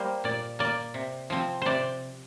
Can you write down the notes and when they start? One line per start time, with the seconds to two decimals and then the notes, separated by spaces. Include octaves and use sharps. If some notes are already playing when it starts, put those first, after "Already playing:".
Already playing: G3 A#3 C5
0.24 A#2 D5
0.59 A#3 D5
0.94 C3
1.30 F3 C4
1.62 C3 C5 D5